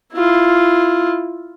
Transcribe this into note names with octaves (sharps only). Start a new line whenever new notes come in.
E4 F4